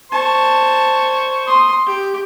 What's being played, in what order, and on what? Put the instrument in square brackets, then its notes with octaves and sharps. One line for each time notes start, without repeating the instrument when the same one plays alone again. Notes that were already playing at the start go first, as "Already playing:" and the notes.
[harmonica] C5 C#6 [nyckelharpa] A5
[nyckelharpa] C6 D#6
G4